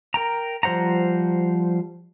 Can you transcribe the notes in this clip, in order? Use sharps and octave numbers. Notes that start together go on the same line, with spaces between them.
A#4 G5 A#5
F3 G3 C5 F#5 A#5